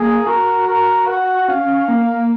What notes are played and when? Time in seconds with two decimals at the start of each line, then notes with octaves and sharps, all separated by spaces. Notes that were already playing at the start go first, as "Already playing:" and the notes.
Already playing: A#3 G#4
0.27 F#4 A#4
0.68 A#4
1.07 F#5
1.48 C#4 F5
1.88 A#3